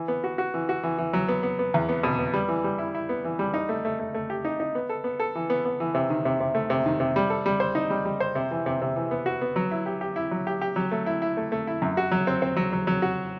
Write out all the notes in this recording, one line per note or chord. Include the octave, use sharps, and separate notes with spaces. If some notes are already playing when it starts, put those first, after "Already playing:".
Already playing: E3
B3
F#4
F#4
E3
F#4
E3
E3
F#3
B3
B3
B3
E2
B3
B2
B3
G3
E3
G3
E4
E4
B3
E3
G3
D#4
A3
A3
A3
A3
G4
D#4
D#4
B3
A4
B3
A4
E3
B3
B3
E3
C3
D#3
C3
C3
A3
C3
D#3
C3
G3
A4
G3
C5
D#4
G3
G3
C5
C3
E3
C3
C3
E3
B3
F#4
B3
F#3
E4
G4
G4
E4
F#3
G4
G4
F#3
A3
E4
E4
A3
A3
E4
F#2
F#4
F#3
C4
C4
F#3
F#3
F#3
F#4